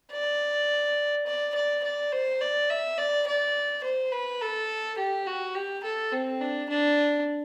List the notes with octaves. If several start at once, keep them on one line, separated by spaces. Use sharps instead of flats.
D5
D5
D5
D5
C5
D5
E5
D5
D5
C5
B4
A4
G4
F#4
G4
A4
C4
D4
D4